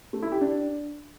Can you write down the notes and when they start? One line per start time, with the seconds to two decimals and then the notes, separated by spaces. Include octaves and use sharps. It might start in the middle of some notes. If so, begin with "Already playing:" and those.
0.13 A3
0.22 E4
0.32 G4
0.41 D4